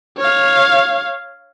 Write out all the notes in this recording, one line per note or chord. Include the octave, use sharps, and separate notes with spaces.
C#5 F5